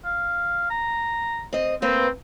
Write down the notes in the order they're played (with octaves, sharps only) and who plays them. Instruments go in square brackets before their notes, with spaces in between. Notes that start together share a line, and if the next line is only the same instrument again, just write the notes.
[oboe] F5
A#5
[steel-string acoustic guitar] C4 D#5
[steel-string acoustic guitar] A#3 B4 C5 [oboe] C4